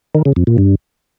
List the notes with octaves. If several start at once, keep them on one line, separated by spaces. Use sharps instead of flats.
D#3
C#3
F2
A#2
G2